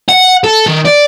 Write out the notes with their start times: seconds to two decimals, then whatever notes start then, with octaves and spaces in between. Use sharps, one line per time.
0.09 F#5
0.44 A4
0.66 D#3
0.85 D5